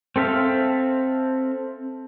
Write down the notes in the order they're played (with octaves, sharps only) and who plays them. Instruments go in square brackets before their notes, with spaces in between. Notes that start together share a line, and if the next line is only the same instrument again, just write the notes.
[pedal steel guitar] C4 A4 E5 F5